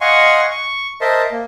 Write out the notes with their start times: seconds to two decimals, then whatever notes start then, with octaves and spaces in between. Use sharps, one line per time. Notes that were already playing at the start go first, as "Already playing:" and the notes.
0.01 D#5 F5 F#5 G#5 C6 C#6
0.51 C#6
1.01 A#4 C5 D#5 E5 A5 C6
1.32 A#3